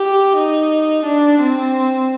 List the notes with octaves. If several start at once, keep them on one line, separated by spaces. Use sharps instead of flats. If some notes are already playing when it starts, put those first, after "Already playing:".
Already playing: G4
D#4
D4
C4